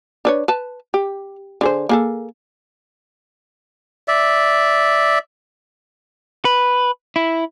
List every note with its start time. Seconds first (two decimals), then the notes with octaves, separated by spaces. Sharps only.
0.25 D4 B4 C#5
0.48 B4 A5
0.94 G4
1.61 D3 G#4 C5
1.89 A#3 G#4 A4
4.08 D5 E5
6.45 B4
7.16 E4